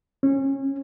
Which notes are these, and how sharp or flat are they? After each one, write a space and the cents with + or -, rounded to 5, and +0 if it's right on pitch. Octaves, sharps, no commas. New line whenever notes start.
C#4 -25